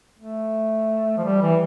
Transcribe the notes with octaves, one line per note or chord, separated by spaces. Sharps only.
A3
F3
G3
E3